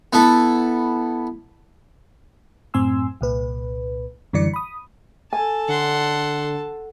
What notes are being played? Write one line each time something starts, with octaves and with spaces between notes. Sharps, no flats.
B3 E4 A4
F#2 A2 C4 G#5 C6 E6
C2 A#2 B4
F#2 D3 E3 G3 D5 C#7
B5 D#6
A4 G#5 A5
D3 F#5 C6